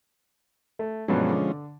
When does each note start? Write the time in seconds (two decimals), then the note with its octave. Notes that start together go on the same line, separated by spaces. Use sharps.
0.79 A3
1.08 G2 B2 F3 F#3 G#3 C#4
1.29 D3